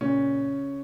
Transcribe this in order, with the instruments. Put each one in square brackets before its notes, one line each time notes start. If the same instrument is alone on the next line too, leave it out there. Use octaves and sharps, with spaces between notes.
[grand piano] A#2 C#3 C#4